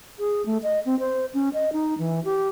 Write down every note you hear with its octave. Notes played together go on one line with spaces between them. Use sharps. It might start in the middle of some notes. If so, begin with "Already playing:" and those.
G#4
A3
D#5
C4
C5
C#4
D#5
D#4
E3
G4